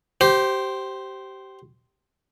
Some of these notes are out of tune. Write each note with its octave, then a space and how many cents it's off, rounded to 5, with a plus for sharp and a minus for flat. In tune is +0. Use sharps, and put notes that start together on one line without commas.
G4 -20 C5 +0